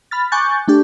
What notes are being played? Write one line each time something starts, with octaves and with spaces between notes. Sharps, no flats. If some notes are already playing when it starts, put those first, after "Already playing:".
B5 F6 A6
G#5 C#6 D6 F#6 G6 A6
A3 D4 G4